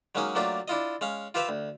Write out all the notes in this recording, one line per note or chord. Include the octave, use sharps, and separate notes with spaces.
F#3 G#3 A#3 C#4 D#4 G#4
F#3 A3 A#3 D4 F4 G4
D4 E4 F4 D#5
G#3 C#4 F5
F4 G4 B4 C5 E5 F5
D2